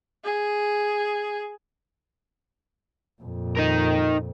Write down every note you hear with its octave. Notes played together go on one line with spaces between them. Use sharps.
G#4
F2 A#2
D#4 A#4